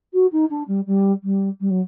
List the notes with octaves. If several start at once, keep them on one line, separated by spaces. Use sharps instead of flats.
F#4
D#4
D4
G3
G3
G3
G3
F#3